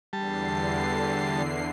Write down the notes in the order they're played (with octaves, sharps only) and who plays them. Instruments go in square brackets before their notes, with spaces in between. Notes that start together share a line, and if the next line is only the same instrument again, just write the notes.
[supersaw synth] E2 D3 C7 [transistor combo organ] G3 A5